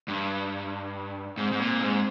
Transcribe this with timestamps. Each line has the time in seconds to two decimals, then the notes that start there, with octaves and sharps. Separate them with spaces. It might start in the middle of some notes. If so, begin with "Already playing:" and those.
0.08 G2 D4
1.38 G#2 C4
1.52 G#2
1.60 A#2
1.80 G#2